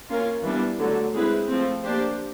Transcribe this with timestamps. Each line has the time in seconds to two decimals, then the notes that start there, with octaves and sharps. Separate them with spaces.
0.10 A#3 C#4 F4 A#4
0.44 E3 G3 B3 D4
0.79 D3 F#3 A3
1.14 G#3 C4 E4 G#4 B4
1.48 F3 A3 C4
1.84 A#3 D4 G4 C5